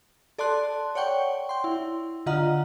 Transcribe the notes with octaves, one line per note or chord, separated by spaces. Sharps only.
A4 D5 A5 C6 F#6
C#5 D5 F#5 G5 C#6
G5 C6
E4
D3 F4 D#5 F#5 A#5 F6